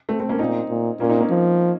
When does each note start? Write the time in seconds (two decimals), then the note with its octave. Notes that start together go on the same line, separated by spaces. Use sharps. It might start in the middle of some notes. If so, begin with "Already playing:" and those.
0.09 A3 C4
0.20 A3 C4
0.29 A#3 C#4
0.39 A#2 C4 D#4
0.69 A#2
1.00 A#2 A#3 C#4
1.10 C4 D#4
1.20 A#3 C#4
1.30 F3